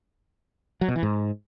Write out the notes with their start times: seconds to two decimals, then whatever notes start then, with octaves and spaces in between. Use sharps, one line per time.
0.81 F#3
0.88 B2
0.96 E3
1.03 G#2